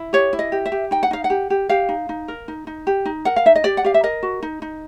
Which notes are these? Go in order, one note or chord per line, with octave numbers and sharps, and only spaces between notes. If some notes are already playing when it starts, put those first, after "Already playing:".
Already playing: E4
G4 C#5
E4
D#5
G4
E5
G4
D#4 G5
F#5
D#4 F5
F#5
G4
G4
G4 F5
D#4
D#4
A#4
D#4
D#4
G4
D#4
A#4 F#5
F5
D#4 E5
D#5
G4 D5
F#5
G4 F5
E5
A#4 D#5
F#4
D#4
D#4